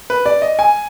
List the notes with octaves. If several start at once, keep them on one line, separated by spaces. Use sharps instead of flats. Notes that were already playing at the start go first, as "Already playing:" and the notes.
B4
D5
D#5
G#5